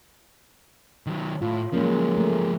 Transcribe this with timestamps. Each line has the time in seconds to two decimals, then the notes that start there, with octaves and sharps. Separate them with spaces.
1.07 D#3 F#3
1.42 A2 F4
1.73 F3 F#3 G#3 A#3 C#4 G#4 A#4
2.17 A3